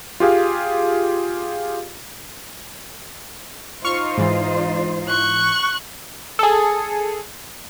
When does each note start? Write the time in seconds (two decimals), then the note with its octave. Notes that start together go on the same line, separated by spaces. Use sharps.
0.20 F4 G4 G#4 F5
3.84 D#4 F4 C5 C#6 F6
4.18 G#2 E3
5.08 C#6 F#6
6.39 G#4 A4